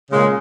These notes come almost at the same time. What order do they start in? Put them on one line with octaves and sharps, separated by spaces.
C#3 G#3 A#2